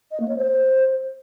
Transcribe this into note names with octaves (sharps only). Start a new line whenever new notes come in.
D#5
A#3
C#5
C5